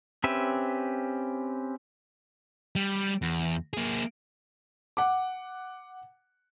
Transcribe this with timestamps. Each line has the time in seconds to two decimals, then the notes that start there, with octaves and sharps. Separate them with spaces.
0.24 C4 C#4 G4 B4 E5
2.76 G3
3.22 E2
3.73 A#3 G#4
4.97 F#5 D6